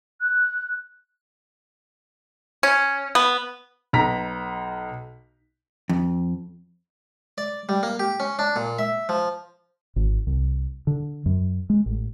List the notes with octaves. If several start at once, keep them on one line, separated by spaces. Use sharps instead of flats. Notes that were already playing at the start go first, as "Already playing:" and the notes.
F#6
C#4
B3
B1 A#5 B6
F2
D5
G3
A#3
G4
C#4
D4
A#2
E5
F3
G#1
C2
D3
F#2
G#3
A1